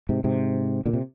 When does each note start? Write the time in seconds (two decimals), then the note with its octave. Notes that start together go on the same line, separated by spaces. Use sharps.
0.09 G#2 C3
0.24 G#2 C3
0.86 A#2 D3
0.93 C3